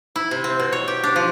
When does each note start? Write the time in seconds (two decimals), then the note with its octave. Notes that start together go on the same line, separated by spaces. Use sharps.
0.16 E4
0.31 C3
0.44 C4
0.59 B2
0.72 C#5
0.88 G4
1.04 D4
1.16 F3